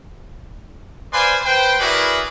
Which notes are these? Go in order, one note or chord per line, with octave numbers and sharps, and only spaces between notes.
B4 C5 D5 F5 G#5 C6
B4 C5 G5
E4 F#4 G#4 A#4 B4 D5